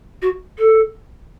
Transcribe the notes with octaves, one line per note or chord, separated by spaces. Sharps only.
F#4
A4